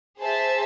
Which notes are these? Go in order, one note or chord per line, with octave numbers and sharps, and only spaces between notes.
G#4 C5 E5 A5